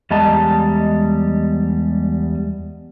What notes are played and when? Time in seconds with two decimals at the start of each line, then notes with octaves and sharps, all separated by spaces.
0.11 E2 G3 G#3 D#5 A5 A#5